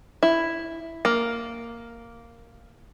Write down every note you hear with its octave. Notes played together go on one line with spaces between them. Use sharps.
E4
A#3